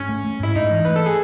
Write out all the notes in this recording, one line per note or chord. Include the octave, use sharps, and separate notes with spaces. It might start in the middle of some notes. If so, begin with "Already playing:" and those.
Already playing: G#2 C#4
A3
A3
G#2 E4
G#2 D#4
E3
A3 B4
A4
G#4